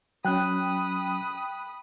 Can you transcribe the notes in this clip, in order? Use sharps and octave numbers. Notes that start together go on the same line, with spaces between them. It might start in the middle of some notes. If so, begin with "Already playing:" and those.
F#3 C#4 G5 B5 D#6 F#6